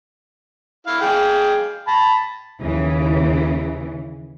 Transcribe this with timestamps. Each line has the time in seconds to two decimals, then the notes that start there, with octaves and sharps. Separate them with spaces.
0.87 E4 F5
1.01 G#4 F5 G5
1.87 A5 B5
2.63 D#2 C#3 E3